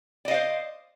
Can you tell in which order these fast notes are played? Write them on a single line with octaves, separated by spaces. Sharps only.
D5 D#5 F5 C5